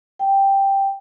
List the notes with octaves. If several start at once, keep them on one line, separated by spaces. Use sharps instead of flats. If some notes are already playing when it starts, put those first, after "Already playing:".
G5